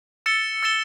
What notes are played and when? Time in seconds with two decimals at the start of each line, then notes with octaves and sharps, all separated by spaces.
0.26 E6 A6 C#7 E7 G7
0.63 E6 A6 C#7 E7 G7